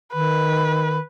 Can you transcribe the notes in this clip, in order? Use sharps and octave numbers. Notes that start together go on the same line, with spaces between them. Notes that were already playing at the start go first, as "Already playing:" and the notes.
D#3 B4